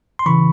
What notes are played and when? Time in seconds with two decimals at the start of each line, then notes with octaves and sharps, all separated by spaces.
0.19 C6
0.26 C#3 E3 B5 C#6